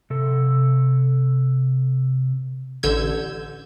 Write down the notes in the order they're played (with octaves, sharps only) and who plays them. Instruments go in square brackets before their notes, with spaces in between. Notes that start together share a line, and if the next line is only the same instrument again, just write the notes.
[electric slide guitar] C3 A4
[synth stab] A1 D3 E6 G6 G#6